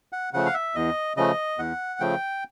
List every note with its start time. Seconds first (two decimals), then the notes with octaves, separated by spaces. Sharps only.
0.13 F#5
0.33 C#3 F3 A3 F#5
0.46 F5
0.54 E5
0.75 E2 D#5
1.17 C#3 F3 A3 D#5
1.58 E2 F#5
2.00 C#3 F3 A3 G5